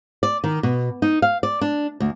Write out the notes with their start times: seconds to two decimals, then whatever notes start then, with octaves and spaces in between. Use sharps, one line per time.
0.23 D5
0.44 D#3
0.63 B2
1.02 D#4
1.22 F5
1.43 D5
1.61 D4
2.00 D2